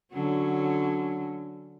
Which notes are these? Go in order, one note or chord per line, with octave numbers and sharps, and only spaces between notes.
D3 F#3 C#4